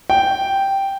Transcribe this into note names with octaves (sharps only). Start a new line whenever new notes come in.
G5